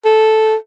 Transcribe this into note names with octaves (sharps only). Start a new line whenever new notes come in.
A4